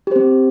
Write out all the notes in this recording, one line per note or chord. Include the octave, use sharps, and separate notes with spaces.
C4 G4 C5